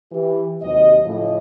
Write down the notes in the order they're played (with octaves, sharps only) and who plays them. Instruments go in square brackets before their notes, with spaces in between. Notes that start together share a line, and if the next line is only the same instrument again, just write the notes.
[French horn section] E3 G4
D#2 C3 F#3 D#5
A2 C#3 F3 D#5